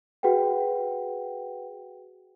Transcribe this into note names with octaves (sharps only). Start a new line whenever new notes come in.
F#4 G#4 B4 F#5 G5